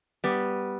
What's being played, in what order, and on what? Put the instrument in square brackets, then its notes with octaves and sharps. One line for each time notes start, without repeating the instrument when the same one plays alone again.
[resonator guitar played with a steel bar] G3 B3